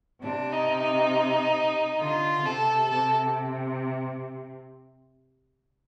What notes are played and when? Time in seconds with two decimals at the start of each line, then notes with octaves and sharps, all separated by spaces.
0.23 C3 D4
0.52 D#4
0.82 D#4
2.00 D3 F4
2.45 C3 A4
2.90 C3 A4